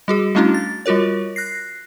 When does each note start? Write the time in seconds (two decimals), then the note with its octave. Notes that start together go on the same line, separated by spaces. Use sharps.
0.08 G3 F#4 G#4
0.35 G3 A3 C#4 D4 E4 F#4
0.54 A6
0.86 G3 F4 F#4 A#4 C#5
1.36 F#6 A#6 C7